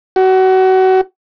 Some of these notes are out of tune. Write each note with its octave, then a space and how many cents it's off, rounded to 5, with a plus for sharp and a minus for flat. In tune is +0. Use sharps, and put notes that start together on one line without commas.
F#4 +30